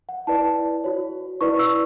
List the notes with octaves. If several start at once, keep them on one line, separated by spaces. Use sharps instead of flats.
F#5
E4 B4 D5 A5
F#4 C#5
E4 B4 D5 C#6
E6